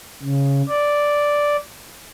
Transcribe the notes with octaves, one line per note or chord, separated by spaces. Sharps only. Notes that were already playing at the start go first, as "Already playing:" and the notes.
C#3
D5